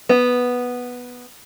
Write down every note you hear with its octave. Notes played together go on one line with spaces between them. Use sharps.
B3